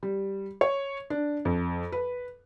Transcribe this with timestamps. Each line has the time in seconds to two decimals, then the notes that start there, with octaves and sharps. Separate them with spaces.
0.03 G3
0.61 C#5
1.10 D4
1.45 F2
1.92 B4